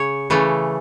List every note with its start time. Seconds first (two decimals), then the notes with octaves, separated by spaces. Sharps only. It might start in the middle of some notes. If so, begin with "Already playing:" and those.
Already playing: C#3 C#5
0.30 C#3 E3 A3